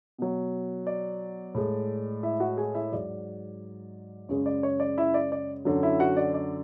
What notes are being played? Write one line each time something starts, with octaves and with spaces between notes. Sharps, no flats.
B2 F#3
D5
A2 G#3
E4 E5
F#4 F#5
G#4 G#5
E4 E5
G#2 F#3 D5
F#2 C#3 G#3 C#5
D5
C#5
D5
E4 E5
D5
D5
F#2 D3 F#3
E4 E5
F#4 F#5
D5
D5